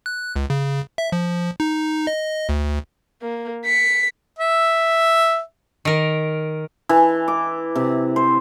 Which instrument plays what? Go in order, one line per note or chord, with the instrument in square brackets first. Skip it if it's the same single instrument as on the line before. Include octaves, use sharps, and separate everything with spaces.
[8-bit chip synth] F#6
C#2
C#3
E5
F3
D#4
D#5
D2
[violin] A#3
B6 C#7
[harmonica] E5
[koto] D#3 A#4
[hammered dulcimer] E3
D6
C3
C5